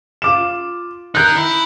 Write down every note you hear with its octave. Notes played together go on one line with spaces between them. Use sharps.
F4 D6 E7
D#4 A#4 F#6 G6
E4